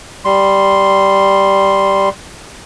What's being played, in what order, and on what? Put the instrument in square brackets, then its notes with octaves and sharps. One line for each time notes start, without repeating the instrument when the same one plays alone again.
[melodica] G3 C6